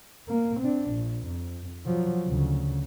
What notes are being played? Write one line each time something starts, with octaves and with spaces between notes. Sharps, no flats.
A#3
C4 D4
A#1
F2
F3 F#3
D2 C#3